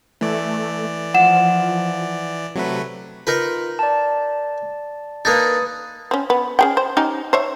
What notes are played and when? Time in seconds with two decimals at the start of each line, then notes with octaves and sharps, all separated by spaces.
0.21 E3 A3 D5
1.14 F3 F#5 E7
2.55 C3 F#3 A3 B4
3.27 D#4 F4 A#4 B4
3.79 D5 A5
5.25 A#3 D4 D#4 B4 D#6 A6
6.11 C4 C#4
6.30 B3
6.59 C#4 G#4 G5
6.77 C5
6.97 C#4 D#4 G4
7.33 C5 C#5 E5